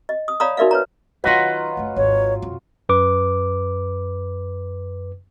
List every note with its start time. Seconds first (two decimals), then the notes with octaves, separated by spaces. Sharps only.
0.09 D#5
0.28 D#6
0.40 C#5 D5 F5 A#5 B5 D#6
0.57 D#4 F#4 A#4 D5 E5 F5
0.71 B4 C#5 A#5
1.24 D#3 F#3 D#4 F4 B4 D#5 F#5
1.77 F#1 A3
1.96 G#1 D#2 C#5
2.42 F2 B2
2.89 F#2 B4 D6